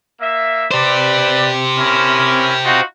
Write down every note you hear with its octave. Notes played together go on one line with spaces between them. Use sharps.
A#3 E5
G4 B4 C5 D5
C#4 E4 A#4
D#4 F4 F#4